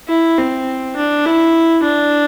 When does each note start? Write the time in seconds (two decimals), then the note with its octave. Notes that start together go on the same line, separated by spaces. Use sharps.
0.08 E4
0.38 C4
0.96 D4
1.25 E4
1.84 D4